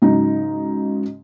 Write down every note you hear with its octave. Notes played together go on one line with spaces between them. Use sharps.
G#2 C#3 F#3 D#4